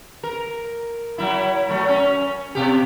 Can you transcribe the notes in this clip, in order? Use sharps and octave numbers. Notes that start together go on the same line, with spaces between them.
A#4
F#3 E4
F#3 A3
C#4
B2 G4